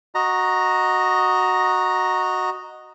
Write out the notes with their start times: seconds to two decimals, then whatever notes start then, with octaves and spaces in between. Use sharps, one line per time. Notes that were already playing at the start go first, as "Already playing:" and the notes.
0.15 F#4 D#5 A#5